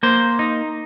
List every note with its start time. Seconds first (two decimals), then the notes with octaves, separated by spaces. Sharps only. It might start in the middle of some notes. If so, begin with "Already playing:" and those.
0.03 A#3 C5
0.39 D#4